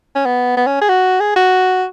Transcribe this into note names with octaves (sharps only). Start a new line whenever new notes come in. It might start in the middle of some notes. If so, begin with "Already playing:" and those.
C#4
B3
B3
C#4
G#4
F#4
G#4
F#4